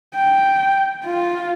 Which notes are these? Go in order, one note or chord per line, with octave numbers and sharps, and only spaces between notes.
G5
F4